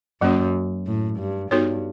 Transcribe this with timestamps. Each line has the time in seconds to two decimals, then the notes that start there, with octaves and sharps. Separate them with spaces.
0.21 F#2 F#3 A#3 C#4 F#4
0.87 A2
1.19 G2
1.51 G2 B3 D#4 F#4 A4 C#5